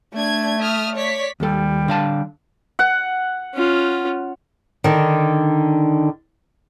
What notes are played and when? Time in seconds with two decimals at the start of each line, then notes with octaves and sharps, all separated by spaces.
0.14 A3 D4 G#6
0.60 E5 D#6 F6
0.95 C#5 D5 B6
1.40 D#2 G3 A4
1.88 D3 F5 A5
2.79 F#5
3.55 C#4 F4
4.84 D3 D#3